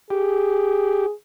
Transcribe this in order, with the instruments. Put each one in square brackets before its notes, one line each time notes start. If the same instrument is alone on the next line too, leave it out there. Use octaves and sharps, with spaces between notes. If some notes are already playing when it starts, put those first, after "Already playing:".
[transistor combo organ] G4 [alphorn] G#4